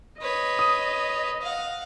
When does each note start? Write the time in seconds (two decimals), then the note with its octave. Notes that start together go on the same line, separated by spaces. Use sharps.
0.21 B4 C#5 D#5
0.59 D#6
1.41 F5 F#5